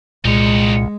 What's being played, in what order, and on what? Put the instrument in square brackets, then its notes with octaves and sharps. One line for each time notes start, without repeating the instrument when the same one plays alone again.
[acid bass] C2 [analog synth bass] A#2 [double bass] G#3 [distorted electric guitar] D#4 C#5